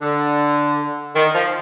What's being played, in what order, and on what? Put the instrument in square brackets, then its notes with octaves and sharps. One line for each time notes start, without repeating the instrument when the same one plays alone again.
[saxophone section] D3
D#3
F3